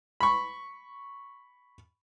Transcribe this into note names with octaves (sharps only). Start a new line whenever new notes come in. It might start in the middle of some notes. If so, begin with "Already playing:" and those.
B5 C#6